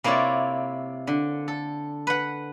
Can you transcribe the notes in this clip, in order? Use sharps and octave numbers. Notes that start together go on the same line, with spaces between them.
C3 A#3 E4 F4 C#5 D5
D3
A4
B4 F#5